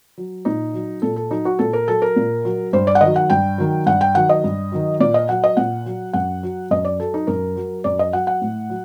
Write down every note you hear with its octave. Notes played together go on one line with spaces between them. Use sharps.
F#3
A#2 D#4
F#3
A#2 A4
A4
F#3 D#4
F#4
A#2 A4
A#4
F#3 A4
A#4
A#2
F#3
G2 C5
D5
F#5
D#3 F#3 D#5
F#5
G2 G5
D#3 F#3
G2 F#5
G5
D#3 F#3 F#5
D#5
G2
D#3 F#3
A#2 D5
D#5
F#3 F#5
D#5
A#2 F#5
F#3
F#2 F#5
F#3
F#2 D#5
D5
F#3 A4
D#4
F#2 A#4
F#3
F#2 D5
D#5
F#3 F#5
F#5
A2
F#3